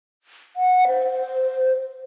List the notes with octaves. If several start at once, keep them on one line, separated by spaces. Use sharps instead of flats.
F#5
C5